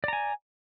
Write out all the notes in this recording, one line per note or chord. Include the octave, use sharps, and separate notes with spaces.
D5 G#5 A#5